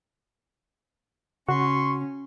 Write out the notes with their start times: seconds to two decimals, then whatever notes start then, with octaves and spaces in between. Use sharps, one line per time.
1.49 C#3 C#4 F#4 C6 C#6